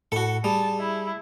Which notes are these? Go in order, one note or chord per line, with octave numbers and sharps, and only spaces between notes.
A2 F#4 A4
G3 G#4 A5
E4